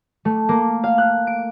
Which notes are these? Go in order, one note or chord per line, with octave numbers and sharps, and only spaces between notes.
A3
A#3
F5
F#6
D7